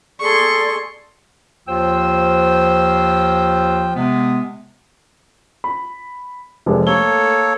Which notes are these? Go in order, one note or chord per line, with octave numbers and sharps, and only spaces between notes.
G#4 A4 D5 C6 C#6
D#2 F3 F4 C5 G5 E6
C3 G#3 B3
B5
F1 C3 G#3
A3 A#3 A4 C#5 G7